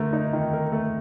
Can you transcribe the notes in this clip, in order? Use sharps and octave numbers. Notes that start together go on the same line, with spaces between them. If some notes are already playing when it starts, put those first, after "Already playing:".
Already playing: D3 A3 A#4
D#4
D#3
A#4
A3